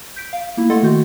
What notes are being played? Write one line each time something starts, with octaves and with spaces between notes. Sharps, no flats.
G6 B6 D7
F5
A#3 E4
A3 A4 D#5 F#5 C6 A6
D#3 F#4 G6